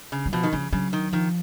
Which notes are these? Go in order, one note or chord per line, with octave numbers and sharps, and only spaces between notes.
C#3
F#3
B2 F3
D#3
C#3 F3
C#3 F#3
D#3
D#3 F3